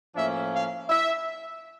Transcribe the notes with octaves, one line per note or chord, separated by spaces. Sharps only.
A2 F3 A#3 C#4 E5
F5
E5